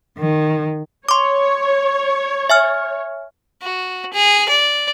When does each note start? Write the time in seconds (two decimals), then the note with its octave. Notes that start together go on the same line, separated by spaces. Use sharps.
0.18 D#3
1.09 C#5 C6 D6
2.50 E5 G#5 F6
3.62 F#4
4.13 G#4
4.49 D5